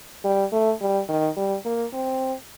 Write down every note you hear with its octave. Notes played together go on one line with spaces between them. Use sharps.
G3
A3
G3
D#3
G3
A#3
C4